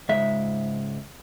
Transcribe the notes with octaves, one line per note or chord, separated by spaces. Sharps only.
C#2 G#2 G#3 E5